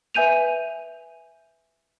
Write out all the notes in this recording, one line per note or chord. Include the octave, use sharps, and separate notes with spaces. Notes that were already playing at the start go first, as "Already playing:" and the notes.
B4 E5 G#5 G6 D#7 F7